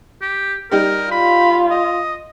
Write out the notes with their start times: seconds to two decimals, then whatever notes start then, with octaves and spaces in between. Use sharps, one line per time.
0.21 G4
0.71 G3 D#4 G4 A#4
1.12 F4 B5
1.70 D#5